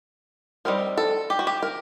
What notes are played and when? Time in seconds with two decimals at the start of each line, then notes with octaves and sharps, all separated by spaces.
0.65 G3 C4 D#4 A#4
0.98 A4
1.30 G4
1.39 F#4
1.47 G4
1.63 A#4